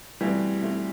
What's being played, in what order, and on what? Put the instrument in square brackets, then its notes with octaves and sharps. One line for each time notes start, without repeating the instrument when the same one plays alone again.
[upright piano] B2 A3 C4 [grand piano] E3 G3
[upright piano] B2 A3 C4